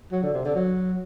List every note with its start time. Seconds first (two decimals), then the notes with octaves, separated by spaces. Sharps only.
0.12 F#3
0.23 D3
0.34 C3
0.45 D3
0.55 F#3